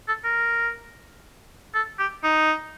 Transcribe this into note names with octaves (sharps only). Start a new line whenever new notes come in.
A4
A#4
A4
G4
D#4